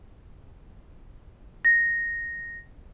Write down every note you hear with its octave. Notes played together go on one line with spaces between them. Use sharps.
A#6